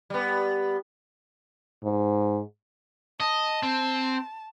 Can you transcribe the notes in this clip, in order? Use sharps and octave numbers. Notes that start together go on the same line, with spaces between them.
G3 B3
G#2
D#5 A5
C4